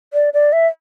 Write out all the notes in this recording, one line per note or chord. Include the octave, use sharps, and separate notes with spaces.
D5
D5
E5